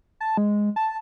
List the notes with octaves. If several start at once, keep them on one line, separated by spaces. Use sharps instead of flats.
A5
G#3
A5